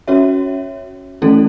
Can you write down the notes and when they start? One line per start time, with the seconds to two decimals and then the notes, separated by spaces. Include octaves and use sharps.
0.07 C#4 F#4 C#5 E5
1.22 E3 A3 C#4 E4 A4